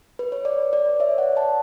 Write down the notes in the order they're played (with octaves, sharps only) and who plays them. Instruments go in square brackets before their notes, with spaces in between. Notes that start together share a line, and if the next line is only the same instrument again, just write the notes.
[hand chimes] B4
C#5
B4 D5
B4 D5
C#5 E5
D5 F#5
F#5 A5